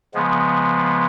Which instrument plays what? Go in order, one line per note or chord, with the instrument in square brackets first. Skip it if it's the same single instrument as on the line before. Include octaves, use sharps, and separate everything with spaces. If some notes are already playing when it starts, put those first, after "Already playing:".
[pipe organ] C#3 F3 G#3 B3